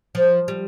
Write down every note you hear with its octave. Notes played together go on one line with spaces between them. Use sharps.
F3
G3